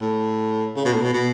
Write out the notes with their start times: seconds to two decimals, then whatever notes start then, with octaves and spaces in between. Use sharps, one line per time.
0.01 A2
0.76 C#3
0.85 B2
0.94 A2
1.02 B2
1.13 B2